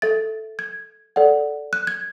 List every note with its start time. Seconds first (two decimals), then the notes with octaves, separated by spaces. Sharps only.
0.02 A4 E5 A6
0.59 G#6
1.16 A4 D5 F#5
1.73 F#6
1.87 G#6